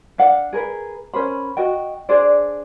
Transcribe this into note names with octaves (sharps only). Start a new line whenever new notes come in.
D4 F5 F#5
G#4 A#4 B4
C#4 A#4 C5 B5
F#4 D#5 G5
D4 G#4 C5 D5